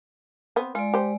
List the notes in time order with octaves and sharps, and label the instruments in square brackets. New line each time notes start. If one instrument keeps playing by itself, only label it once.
[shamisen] B3 C4
[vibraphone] G#3 D5 [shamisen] F4
[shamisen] G4 C5